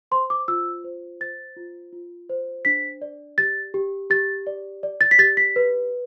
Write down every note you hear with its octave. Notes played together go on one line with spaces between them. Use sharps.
C5 C6
D6
F4 E6
C5
C5 A6
F4
F4
C5
D4 B6
D5
G4 A6
G4
G4 A6
D5
D5
A6
B6
G4 A6
B6
B4